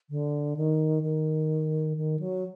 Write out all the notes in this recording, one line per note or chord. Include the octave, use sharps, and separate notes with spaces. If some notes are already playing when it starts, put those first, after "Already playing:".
D3
D#3
D#3
D#3
F#3